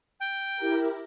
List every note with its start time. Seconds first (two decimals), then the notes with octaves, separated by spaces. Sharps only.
0.20 G5
0.56 E4 G4 A#4